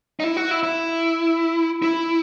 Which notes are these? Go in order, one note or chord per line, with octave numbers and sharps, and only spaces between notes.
D#4
E4
F#4
E4
E4
E4